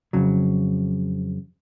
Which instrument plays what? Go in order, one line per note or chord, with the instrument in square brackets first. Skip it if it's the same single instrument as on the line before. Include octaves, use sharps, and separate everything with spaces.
[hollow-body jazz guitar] F2 C#3 F#3